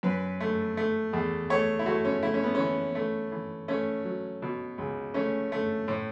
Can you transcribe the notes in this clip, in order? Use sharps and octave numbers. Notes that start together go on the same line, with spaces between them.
F#2 B4
A3
A3
E2
A3 C#5
E4
A3 F#4
C#4
A3 E4
C#4
B3
E3 C#4
A3
E3
A3 C#4
F#3
B2
C#2
A3 C#4
A3
A2